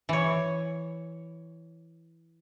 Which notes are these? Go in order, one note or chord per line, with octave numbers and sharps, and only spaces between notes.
E3 C#5